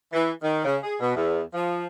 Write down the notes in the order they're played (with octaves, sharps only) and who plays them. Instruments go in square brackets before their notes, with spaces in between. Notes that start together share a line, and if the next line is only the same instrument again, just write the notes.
[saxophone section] E3
D#3
C#3
G#4
B2
E2
F3